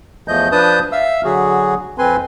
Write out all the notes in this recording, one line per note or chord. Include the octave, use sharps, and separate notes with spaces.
E2 F3 A3 D#5 G6
F3 D4 B4 A5 D#6 G6
E5 F5 E6
D3 F#3 F#4 G#4
F2 C4 B4 G#5 C6